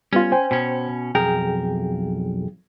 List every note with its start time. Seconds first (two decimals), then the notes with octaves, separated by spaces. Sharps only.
0.13 G3 B3 C#4 F4
0.32 C5 G5 G#5
0.51 B2 C#4
1.15 B1 F2 G#4 A#4 G5